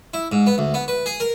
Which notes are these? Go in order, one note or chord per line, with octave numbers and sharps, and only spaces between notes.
E4
G#2
B3
D2
B3
B4
G#4
A#4